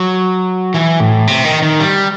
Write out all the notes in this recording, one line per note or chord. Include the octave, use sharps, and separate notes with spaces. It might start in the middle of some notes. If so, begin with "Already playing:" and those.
Already playing: F#3
E3
A2
C3
D#3
D#3
G3